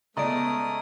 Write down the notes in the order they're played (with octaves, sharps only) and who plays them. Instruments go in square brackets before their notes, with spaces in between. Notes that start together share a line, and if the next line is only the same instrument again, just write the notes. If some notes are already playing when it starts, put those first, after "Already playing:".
[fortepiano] C#2 D5 D#5 [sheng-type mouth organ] A3 D#6 [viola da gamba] B3 [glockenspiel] A#5 D7